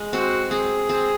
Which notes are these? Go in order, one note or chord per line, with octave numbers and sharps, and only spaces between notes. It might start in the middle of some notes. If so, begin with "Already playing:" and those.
Already playing: G#3
C4 F#4
C4 G#4
C4